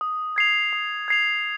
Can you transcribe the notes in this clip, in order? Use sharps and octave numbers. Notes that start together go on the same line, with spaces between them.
D#6
G#6 C7 F7
D#6
G#6 C7 F7